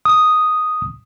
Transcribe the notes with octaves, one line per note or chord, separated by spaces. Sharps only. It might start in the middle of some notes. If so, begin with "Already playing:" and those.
D#6